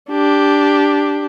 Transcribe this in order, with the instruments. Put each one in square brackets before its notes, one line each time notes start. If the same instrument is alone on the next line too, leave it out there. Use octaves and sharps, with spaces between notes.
[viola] D4 G4